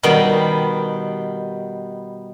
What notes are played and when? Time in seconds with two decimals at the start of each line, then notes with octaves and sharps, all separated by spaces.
0.03 B2 D#3 G3 B3 G5 B5